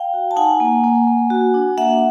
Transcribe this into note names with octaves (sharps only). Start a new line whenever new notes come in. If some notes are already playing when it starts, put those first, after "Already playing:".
Already playing: F5 G5
F#4
A5
D#4 F#5 G#5
A#3
A#3
A#3
F#4
D4
A#3 E5 F#5